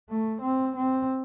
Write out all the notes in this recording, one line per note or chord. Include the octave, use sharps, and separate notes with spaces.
A3
C4
C4